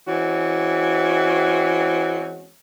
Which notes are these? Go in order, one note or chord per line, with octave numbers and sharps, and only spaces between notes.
E3 G#3 C4 C#4 F#4